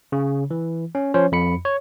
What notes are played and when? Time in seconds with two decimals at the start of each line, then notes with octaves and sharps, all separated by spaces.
0.12 C#3
0.51 E3
0.95 C#4
1.14 F3 C#4 C5 C#5
1.32 F2 B5 C#7
1.65 C#5